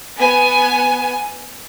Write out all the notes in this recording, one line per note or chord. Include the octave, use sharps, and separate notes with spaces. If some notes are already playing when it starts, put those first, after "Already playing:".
B3 G#5